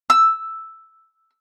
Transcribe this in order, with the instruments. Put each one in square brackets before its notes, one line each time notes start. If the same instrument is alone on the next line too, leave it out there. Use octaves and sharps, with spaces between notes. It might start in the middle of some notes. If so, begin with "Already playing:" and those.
[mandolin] E6